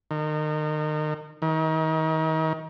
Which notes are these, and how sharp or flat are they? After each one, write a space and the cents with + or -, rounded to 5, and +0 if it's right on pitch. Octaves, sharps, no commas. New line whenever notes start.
D#3 -30
D#3 +35